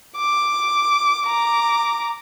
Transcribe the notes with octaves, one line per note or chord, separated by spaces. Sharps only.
D6
A#5 D6